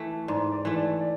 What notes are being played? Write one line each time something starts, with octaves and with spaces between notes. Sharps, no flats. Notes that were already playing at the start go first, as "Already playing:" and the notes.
Already playing: E3 A3
G#2 D5
D5
E3 A3
D5
D5